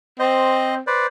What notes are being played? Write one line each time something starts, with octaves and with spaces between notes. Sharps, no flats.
C4 C5 D#5
B4 C5 D5